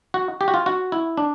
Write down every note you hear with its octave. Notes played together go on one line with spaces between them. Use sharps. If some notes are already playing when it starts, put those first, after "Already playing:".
F#4
G4
F#4
F4
F#4
E4
D4